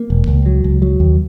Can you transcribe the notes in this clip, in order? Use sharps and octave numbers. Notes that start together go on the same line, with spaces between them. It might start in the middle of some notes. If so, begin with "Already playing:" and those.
Already playing: A#3
E1
C#2
F#3
C#2
F#3
D#2